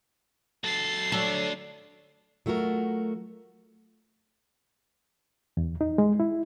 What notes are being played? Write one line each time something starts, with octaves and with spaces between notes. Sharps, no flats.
F#3 A4 A6 C7
F#3 A3 D4 A4
F#3 A3 F4 F#4 A#4
E2
D#4
G#3
E4